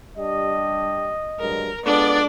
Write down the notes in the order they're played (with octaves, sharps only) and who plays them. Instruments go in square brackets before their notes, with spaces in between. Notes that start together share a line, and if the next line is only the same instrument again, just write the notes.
[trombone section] G3 D4 G4 [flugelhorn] D#5
[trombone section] G2 F#3 G#3 [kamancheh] A#4
[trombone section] G#3 F4 A4 [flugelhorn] B3 [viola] D4 [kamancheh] D5